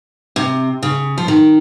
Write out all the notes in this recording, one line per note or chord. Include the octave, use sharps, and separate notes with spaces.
C3
C#3
F3
D#3